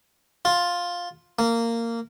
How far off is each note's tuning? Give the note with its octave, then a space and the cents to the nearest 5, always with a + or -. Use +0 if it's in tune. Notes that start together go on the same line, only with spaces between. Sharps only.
F4 +10
A#3 -15